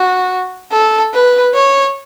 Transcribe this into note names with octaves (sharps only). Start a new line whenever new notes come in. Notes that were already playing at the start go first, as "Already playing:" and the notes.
Already playing: F#4
A4
B4
C#5